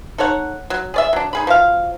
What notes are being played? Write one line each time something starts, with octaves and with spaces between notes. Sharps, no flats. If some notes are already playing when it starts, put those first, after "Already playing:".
D#4 A4 C#5 F#5
F#3
G#4 D5 E5
F#3 D4
D#4 G#4 B5
F3 F#3 F5